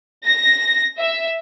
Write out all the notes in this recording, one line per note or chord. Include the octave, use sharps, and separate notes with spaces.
A#6
E5